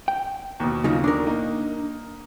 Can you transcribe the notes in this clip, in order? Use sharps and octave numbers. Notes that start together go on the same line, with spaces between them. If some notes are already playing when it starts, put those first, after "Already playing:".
G5
D#2 B2
C#3 F3 D#4
D4 A#4
A#3 D#4